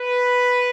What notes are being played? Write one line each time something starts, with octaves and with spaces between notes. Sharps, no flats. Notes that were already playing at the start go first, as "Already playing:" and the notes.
Already playing: B4